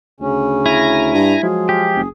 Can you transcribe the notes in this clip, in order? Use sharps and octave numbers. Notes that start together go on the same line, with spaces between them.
D2 C#3 C#4
E4 G#5 A#5 A#6
G2
F3 F#3 G#3 G#4
G4
F#1